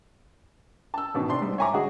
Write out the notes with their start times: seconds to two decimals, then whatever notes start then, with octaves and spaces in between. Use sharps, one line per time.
0.94 A5 E6
1.14 A1 B2 D#3
1.29 C3 D4 C6
1.41 G#2 G3
1.58 C#5 E5 G#5 A#5 C#6 D6
1.73 D3 G#3 F#4 G#4